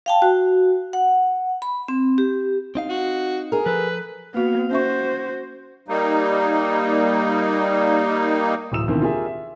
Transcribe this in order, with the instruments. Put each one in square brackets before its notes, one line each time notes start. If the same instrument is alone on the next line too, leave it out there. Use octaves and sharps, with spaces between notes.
[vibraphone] F5 G5 A5
F#4
F#5
B5
C4
G4
[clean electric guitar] C4 D#4 F5
[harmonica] F#4
[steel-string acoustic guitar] G#4 A#4
[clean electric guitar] F3 A4 [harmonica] B4
[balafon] A#3 F#4 [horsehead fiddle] B3 F5
[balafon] C#4 E5 C#6 [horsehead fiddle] F#4 C5
[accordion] G3 A#3 D#4
[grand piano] D1 E3 D#6 E6 E7
D2 B2 D#3 E3 A#3 C4
F4 G4 G#4 A#4 E5
E5